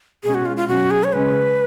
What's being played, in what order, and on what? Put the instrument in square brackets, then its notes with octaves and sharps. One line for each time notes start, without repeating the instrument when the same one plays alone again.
[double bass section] B2 G#3 C#4 [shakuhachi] G#4
[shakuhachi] F#4
F4
F4
[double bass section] B2 F#3 C#4 [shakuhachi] F#4
[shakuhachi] G#4
C#5
[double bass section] C#3 G#3 C#4 [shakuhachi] B4